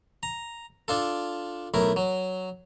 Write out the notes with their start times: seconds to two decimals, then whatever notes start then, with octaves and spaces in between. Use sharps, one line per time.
0.23 A#5
0.88 D4 F4 A4
1.74 B1 A3 E4 A#4
1.96 F#3